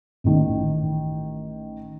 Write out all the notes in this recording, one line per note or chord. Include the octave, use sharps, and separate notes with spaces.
A1 D#3